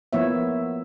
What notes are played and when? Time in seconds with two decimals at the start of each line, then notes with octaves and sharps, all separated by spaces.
0.13 F3 A#3 B3 E4 C#5 E5